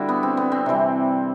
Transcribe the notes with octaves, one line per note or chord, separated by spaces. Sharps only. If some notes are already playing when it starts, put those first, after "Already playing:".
Already playing: D3 G3 D4 E4 F#4
B3
C4
B3
C4
C3 E3 G3